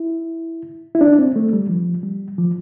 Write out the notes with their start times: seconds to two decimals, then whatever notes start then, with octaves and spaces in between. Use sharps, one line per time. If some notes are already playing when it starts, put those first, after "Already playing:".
Already playing: E4
0.95 E4
1.01 D4
1.19 C4
1.36 A3
1.53 G3
1.69 F3
2.03 G3
2.38 F3